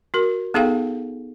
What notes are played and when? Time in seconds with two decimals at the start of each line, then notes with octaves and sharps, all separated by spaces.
0.14 F#4 A#4
0.54 B3 D#4 G#4 A4 F5 G5